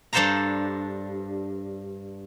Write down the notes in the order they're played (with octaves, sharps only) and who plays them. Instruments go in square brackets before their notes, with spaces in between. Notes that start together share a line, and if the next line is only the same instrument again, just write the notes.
[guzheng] G2 D4 A4 C5 F5 A#5